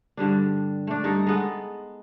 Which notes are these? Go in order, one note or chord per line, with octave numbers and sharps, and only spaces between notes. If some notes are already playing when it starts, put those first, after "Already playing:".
G2 D3 G3 D4
A3 D4
G2 D#4 A4
G#3 B3 A4